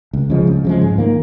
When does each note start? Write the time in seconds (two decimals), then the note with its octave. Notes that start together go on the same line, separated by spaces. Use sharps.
0.13 C#2
0.30 C#3 F3 G#3
0.47 C#2
0.65 C#3 F3 G#3
0.81 G#2
0.98 D#3 A#3